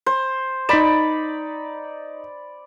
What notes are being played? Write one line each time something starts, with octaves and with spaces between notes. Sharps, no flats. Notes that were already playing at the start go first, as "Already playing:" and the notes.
C5
D#4 D5 B5 B6 E7